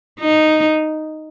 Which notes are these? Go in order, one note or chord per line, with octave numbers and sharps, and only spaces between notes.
D#4